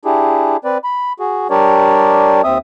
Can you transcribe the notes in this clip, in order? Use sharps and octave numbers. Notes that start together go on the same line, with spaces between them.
D4 E4 G4 G#4
C4 B4 D5
B5
F#4 G#4
G3 D4 G4 A#4 C#5 D5
D#2 C4 E5 D#6